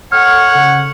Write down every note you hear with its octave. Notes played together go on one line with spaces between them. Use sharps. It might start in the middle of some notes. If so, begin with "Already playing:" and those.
A4 C#5 F#5 F6
C#3